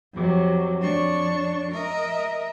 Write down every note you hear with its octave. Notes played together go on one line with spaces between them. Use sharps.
F2 C3 F#3
F2 D4 C#5 C#6
A#4 D#5 E5